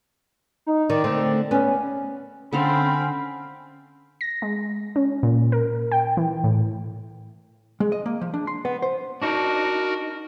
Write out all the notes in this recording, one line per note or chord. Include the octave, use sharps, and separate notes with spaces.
D#4
D#3 D5
D3 A3 C4
B3 C#4
D3 C4 C#4 A4 F5 B5
A#6
G#3
C#4
A#2
A#4
G5
E3
A2
G#3
D#5
A#3
F3
D4
C6
B3
C5
D4 D#4 F#4 A#4